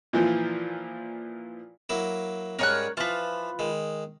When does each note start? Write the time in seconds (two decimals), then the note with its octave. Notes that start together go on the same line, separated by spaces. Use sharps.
0.13 A#2 E3 F3
1.89 F#3 A#3 E4
2.59 G#2 G3 C#4 A#4 C#5 F#6
2.97 E3 F3 F4 B4
3.59 D#3 G#3